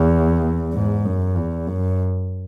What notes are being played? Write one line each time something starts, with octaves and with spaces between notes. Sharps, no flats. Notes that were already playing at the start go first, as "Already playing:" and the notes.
Already playing: E2
G#2
F#2
E2
F#2